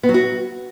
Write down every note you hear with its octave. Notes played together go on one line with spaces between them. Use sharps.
B3
F#3
F#4